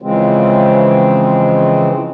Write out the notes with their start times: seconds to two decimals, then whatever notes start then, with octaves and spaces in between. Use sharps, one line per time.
0.02 C#3 E3 F3 G#3 C4